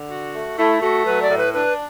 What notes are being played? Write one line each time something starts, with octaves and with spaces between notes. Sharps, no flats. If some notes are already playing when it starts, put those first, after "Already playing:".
Already playing: D3
F#4
A3
A3 E4
A3 F#4
F#3 B4
D5
A2
B4
D4 B4